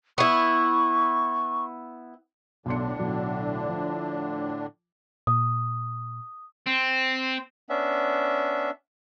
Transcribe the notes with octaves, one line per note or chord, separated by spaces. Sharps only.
B3 E4 C#6
B1 A2 D3 D4 C6 C#7
B1 F#3
F3
A#2 D#6
C4
B3 C#4 D4 E5